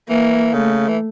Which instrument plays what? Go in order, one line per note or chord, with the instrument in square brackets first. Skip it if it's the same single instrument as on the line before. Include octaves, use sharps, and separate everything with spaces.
[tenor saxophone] E3 [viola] A#3
[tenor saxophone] C#3 [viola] A3
[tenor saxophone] E3